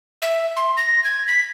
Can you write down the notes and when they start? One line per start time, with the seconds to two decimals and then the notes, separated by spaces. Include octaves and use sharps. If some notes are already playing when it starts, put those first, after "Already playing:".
0.22 E5
0.57 C6
0.77 A#6
1.04 G#6
1.27 B6